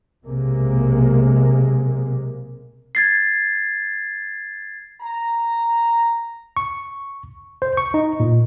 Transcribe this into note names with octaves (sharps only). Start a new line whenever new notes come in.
B1 C3 G#3 A#3
G#6 A6 C7
A#5
C#6
C5
C#6
D#4
A#2